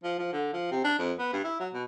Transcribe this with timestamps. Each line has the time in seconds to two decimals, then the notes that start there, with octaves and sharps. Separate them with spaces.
0.04 F3
0.19 F3
0.33 D3
0.53 F3
0.71 C3
0.84 D4
0.99 F2
1.19 B3
1.33 G2
1.44 E4
1.60 F#3
1.74 B2